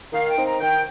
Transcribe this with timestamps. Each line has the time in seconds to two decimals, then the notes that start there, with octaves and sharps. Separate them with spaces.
0.13 D#3 F5
0.29 G5
0.36 C4 D#4
0.45 A#5
0.60 D#3 G5